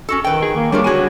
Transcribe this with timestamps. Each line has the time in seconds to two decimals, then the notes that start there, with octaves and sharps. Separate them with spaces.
0.09 C#4 F#4 A4
0.24 D#3 B4 G5
0.42 G#4
0.56 A#3
0.72 G3 A3 D4 F4 A4 A#4 C#5
0.84 D3 B3 F#4 G#4 G#5